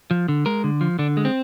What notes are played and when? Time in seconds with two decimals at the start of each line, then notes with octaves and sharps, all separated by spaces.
0.11 F3
0.28 D3
0.46 G#3 A#4
0.64 D3
0.81 F3
0.99 D3 D4
1.17 G#3
1.25 C4